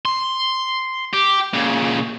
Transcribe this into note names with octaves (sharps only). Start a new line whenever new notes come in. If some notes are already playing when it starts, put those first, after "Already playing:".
C6
G4
A#2 C#3